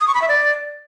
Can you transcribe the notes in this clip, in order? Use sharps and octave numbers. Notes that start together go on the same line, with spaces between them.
D#6
C#6
B5
E5
D5